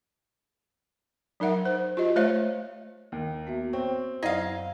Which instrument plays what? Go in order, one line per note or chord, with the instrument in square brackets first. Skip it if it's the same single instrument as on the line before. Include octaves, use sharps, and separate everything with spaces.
[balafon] F#3 D#4 A#4 E5 F#5
C5
F4 G4 D#5
A3 C5 C#5 E5 F5
[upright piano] D#2
[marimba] B3 F#4 E5
[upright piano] C4 [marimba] C#5 G5 C#6
[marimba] F#2 F#3 [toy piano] E4 D5 F#5 [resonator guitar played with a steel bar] D#5 F5